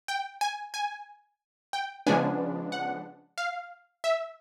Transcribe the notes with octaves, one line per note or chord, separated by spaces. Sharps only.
G5
G#5
G#5
G5
C#3 F3 G#3 B3 D4 G#5
F#5
F5
E5